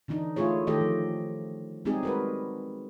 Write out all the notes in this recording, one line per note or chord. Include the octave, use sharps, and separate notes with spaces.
D3 E3 D4 D#4
A3 E4 F4 G#4 C#5
D#3 A3 G4 A4 D#5
F3
G3 G#3 C4 D#4 G4 G#4
F#4 A#4 B4